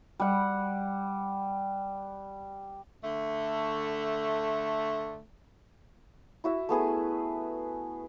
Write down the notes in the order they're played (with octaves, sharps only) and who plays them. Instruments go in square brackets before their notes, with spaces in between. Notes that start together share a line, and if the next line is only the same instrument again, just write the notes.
[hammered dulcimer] G3 F#5
[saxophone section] D3 A3
[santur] E4 F#4 E5
A3 B3 G#4 B4